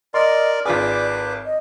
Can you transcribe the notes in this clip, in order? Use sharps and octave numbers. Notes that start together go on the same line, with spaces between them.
A#4 D5 D#5 C6
G#1 F4 G#4 B4 D5 D6
D#5